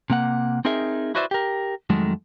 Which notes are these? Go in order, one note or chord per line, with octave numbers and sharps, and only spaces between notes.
C3 A#3 F#5
C4 D#4 G#4 A#4 E5
E4 F#4 B4 C5 D5 E5
G4 A#4
F2 D#3 F#3 G#3 A3